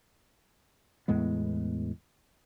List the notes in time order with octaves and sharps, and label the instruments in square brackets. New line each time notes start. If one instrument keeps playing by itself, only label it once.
[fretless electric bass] E2 A2 G#3 B3